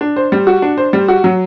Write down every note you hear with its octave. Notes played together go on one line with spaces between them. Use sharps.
D4
C5
G3
F#4
D4
C5
G3
F#4
F#3